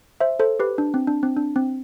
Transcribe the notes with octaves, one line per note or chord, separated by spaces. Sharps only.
C5 E5
A4 C5
G4 B4
D4
C4
D4
C4
D4
C4